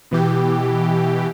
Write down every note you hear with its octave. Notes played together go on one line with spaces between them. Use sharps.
B2 E3 G4